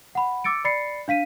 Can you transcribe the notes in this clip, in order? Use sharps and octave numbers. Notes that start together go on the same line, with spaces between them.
F#5 B5
D6 E6 A6 C#7 D7
D5 B5 A6 C7 C#7
D4 F5 B6 D#7